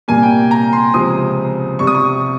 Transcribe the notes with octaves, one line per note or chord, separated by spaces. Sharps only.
C2 A#2 G3 A#3 G#5
G5
A#5
C6
C#2 C3 F3 D#6
C2 C3 G3 C#6
D#6
C#6